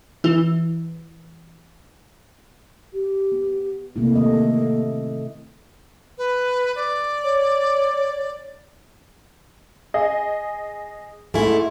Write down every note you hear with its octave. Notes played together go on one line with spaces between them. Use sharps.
E3 E4
G4
B3
C3 A3 A#3 E4
D#3 A3 D#5
B4
D5
C#5
G#4 D#5
G#2 A3 E4 G#5